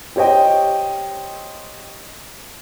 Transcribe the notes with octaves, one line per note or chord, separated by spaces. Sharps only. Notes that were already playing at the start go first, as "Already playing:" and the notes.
G4 C5 C#5 D#5 G5